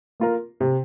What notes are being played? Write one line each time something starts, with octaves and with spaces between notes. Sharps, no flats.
A#3 F4 A#4
C3